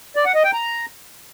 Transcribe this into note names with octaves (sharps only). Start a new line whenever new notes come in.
D5
F#5
D#5
G5
A#5